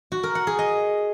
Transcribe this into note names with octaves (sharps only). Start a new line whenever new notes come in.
F#4
A#4
F#5
G#4
D#5